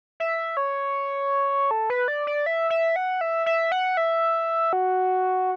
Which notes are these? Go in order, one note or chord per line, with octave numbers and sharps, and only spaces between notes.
E5
C#5
A4
B4
D5
D5
E5
E5
F#5
E5
E5
F#5
E5
F#4